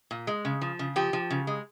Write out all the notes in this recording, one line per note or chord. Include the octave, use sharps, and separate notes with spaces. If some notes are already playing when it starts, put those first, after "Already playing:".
A#2
G#3
C#3
F3
C#3
F3 G4
F3
C#3
G#3